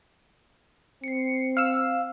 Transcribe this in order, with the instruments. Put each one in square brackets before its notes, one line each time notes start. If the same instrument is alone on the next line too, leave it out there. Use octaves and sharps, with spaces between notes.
[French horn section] C4 [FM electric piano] C7 C#7
[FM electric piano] F5 E6